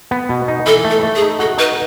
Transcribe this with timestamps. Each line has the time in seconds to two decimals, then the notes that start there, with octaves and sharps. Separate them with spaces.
0.11 B3
0.29 B2
0.48 D#4
0.66 E3 A4
0.84 A3
0.91 A4
1.03 A3
1.16 G#4
1.22 D#4
1.39 F#4 A4
1.58 D#4 B4